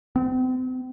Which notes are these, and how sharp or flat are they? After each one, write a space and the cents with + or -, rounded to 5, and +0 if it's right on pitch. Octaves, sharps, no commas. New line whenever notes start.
C4 -40